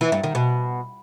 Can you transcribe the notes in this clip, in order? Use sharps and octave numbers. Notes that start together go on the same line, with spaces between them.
E3
G2
D#3
B2